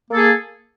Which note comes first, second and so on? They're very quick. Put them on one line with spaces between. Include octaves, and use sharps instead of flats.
A#3 A4 G#4